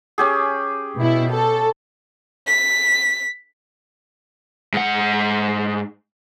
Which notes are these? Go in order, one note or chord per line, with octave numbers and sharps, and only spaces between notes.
C#4 G4 G#4
B2 E4
A4
B6
G#2 F#5